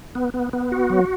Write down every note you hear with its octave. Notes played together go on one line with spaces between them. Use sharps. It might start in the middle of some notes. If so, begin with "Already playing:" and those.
B3
B3
B3
F#4
F#3